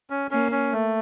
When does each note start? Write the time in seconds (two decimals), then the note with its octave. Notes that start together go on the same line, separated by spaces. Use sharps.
0.10 C#4
0.31 A#3 C#4
0.52 C#4
0.73 A3